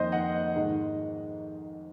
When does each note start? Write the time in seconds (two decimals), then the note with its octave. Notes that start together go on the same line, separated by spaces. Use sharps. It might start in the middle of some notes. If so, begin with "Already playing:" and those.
Already playing: F2 D#3 A#3 C5 D#5
0.12 D#5 F#5
0.56 G#2 D#3 G#3